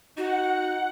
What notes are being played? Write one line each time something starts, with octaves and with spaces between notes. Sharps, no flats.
D#4 F#4 F#5